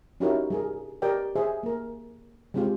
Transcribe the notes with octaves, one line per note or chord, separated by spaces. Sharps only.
C#4 D#4 E4 F#4 G4 A#4
G3 G#4 A#4
G4 A#4 B4 D5 D#5 G5
G#4 C5 D#5 E5
A#3 A#4
G3 G#3 C4 F4 G4 G#4